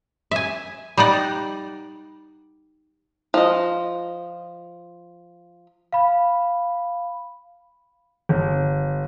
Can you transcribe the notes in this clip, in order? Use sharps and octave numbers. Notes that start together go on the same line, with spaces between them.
E5 G#5
G3 D#4 D5 F#5
F3 D#5
F5 B5
G1